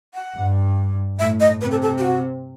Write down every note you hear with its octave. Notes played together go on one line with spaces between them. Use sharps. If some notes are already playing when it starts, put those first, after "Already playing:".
F#5
G2
A2 E5
D#5
C3 B4
A4
A4
G4
F#4